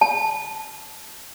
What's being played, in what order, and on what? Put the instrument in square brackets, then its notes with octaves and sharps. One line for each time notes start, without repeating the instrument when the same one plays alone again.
[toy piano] A5